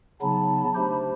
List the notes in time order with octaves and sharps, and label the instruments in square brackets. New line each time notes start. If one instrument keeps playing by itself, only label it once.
[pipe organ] C#3 F#3 B3 D#4 [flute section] A5 B5
[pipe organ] A3 D4 G4 C5 [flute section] A5 B5